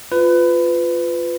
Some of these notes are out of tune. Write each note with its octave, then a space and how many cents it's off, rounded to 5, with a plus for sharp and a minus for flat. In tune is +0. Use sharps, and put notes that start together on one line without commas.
F4 +0 B4 +20